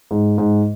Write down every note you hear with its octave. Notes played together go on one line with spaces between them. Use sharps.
G#2
G#2